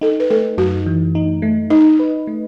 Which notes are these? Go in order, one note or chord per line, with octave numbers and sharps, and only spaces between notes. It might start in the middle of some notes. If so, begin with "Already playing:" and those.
D#4 A4
B4
A3 A4
F#2 F#4
E3
D#4
A3
D#4 D#5
B4
A3